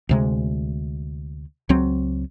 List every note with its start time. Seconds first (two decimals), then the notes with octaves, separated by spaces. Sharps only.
0.09 D2 C3 G#3
1.69 C#2 F#3 C4